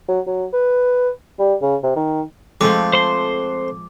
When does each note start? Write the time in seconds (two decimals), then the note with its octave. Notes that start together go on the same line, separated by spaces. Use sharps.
0.08 F#3
0.27 F#3
0.53 B4
1.39 G3
1.62 C#3
1.83 C3
1.96 D#3
2.61 F2 F3 G#3 A3 D6
2.93 C5 C6